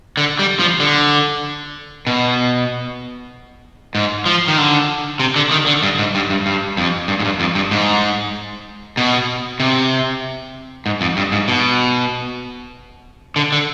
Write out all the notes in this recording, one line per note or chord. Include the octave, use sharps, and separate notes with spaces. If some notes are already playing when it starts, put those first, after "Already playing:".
D3
G3
F3
D3
B2
G#2
F3
D#3
D3
C3
D3
D#3
D3
G2
G#2
G2
G2
G2
F2
G2
G#2
G2
F2
G2
G#2
B2
C3
G#2
F2
G2
G#2
B2
D3
D3